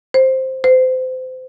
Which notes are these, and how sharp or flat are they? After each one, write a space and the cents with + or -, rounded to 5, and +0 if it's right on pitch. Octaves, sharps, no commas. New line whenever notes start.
C5 +5
C5 -30